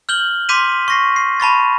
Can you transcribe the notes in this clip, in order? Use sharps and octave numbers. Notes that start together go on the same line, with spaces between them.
F6 G6 F#7 G7
C6 D6 G6 B6 D#7 F7
C#6 A#6 C7
C7
A5 B5 C#6 A6